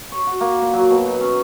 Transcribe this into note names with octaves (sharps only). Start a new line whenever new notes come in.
C#5
F#4
A#3
A#2
F#3
B2
D#4
C#4